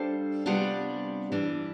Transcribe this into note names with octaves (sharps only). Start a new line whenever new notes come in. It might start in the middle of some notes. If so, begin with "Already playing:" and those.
Already playing: G3 D4 A4 C5 F5
C3 G3 B3 D4 F4
G2 E3 G3 D4